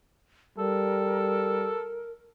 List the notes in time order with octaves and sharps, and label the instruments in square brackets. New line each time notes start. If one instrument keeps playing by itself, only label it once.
[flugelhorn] G3 [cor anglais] A4 [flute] A#4